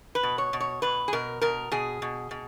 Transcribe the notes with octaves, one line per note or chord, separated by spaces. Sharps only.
B4
B2
C#5
B2
C#5
B2 B4
G#4
B2 A#4
B2 A#4
B2 G#4
B2
B2